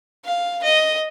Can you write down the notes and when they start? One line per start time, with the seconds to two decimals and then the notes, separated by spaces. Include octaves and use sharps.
0.25 F5
0.63 D#5